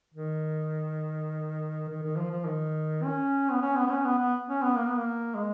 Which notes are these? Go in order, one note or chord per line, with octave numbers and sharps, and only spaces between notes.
D#3
D#3
D#3
F3
F3
D#3
C#4
B3
C#4
B3
B3
C#4
B3
B3
C#4
B3
A#3
B3
A#3
G#3